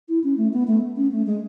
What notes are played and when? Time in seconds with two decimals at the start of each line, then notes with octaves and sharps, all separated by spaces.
0.09 E4
0.24 C#4
0.37 A3
0.53 B3
0.67 A3
0.97 C#4
1.12 A3
1.26 G#3